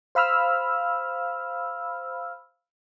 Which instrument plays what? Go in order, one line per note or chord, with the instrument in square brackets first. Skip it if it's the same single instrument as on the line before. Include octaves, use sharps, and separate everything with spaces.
[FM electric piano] C5 F5 B5 E6 F6